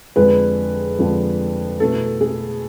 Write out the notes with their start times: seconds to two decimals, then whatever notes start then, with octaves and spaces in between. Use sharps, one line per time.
0.16 F2 D3 F3 G#3 G#4 B4
0.99 F2 D3 F3 G#3
1.80 B2 A3 E4 A4
2.21 G#4